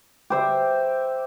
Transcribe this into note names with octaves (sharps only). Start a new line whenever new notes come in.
G4 C5 E5